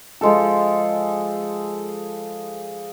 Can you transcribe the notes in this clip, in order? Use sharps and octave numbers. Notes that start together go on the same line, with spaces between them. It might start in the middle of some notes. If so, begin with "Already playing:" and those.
F3 G#3 A4